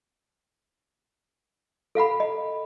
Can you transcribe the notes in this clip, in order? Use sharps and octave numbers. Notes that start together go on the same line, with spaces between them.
A4 F5 F#5 B5
D#5